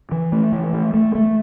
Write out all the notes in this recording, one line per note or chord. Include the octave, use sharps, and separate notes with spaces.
E3
A3
E3
A3
A3
A3